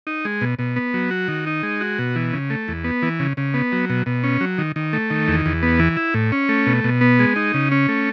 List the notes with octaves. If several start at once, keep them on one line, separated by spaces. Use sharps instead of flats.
D#4
G#3
B2
B2
B3
F#3
F#4
D#3
D#4
G#3
F#4
B2
E3
C#3
A3
E2
B3
E3
C#3
C#3
B3
F#3
B2
B2
C#4
F#3
D#3
D#3
A3
D#3
E2
E2
B3
E3
E4
A2
C#4
A3
B2
B2
B3
G#3
D#4
C#3
C#4
A3